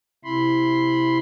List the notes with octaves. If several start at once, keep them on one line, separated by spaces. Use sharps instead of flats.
C3 E4 B5 C6